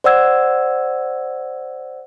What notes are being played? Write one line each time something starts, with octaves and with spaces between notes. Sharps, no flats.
C5 D5 F#5 E6 G#6